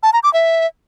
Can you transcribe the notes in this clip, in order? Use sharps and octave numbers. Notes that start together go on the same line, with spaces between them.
A5
A#5
D6
E5